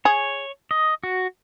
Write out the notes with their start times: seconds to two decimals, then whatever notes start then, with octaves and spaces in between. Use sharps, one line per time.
0.05 G#4 C#5
0.71 D#5
1.03 F#4